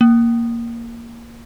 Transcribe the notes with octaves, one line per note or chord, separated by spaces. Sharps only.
A#3